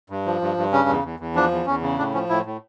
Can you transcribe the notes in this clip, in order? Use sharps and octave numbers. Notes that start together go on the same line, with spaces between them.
G2
F3
G2
G2
C#3 C#4
E2
E2
E2
F3 D4
E2
E2 C#4
C#3
A2 D4
F3 C#4
A2 E4
A2